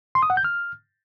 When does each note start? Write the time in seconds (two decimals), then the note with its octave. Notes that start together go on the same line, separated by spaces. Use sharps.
0.15 C6
0.23 D#6
0.30 F#5
0.37 G6
0.44 F6